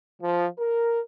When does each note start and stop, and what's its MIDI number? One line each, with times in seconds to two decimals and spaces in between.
0.22 0.46 53
0.59 1.00 70